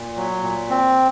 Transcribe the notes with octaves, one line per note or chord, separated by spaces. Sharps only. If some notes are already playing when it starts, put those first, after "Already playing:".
Already playing: A#2
F#3
A#2
C4